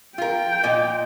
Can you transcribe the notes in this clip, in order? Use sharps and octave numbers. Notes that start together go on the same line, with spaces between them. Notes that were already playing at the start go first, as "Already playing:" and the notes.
F4 A#4 G5
A#2 F4 D#5